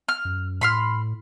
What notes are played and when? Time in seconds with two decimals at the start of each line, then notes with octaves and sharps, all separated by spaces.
0.08 F6
0.25 F#2
0.61 A2 B5 C6 F6